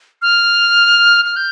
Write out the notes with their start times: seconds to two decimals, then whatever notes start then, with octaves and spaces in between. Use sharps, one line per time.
0.22 F6
1.25 F6
1.36 G6